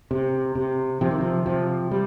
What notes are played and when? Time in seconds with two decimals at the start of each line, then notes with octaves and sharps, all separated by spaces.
0.11 C3
0.55 C3
1.01 C3 F3
1.11 D#3
1.21 F3
1.46 C3 F3
1.91 G3